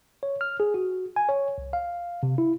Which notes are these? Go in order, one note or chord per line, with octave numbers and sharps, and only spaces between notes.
C#5
F6
G#4
F#4
G#5
C#5
C2
F5
C3
E4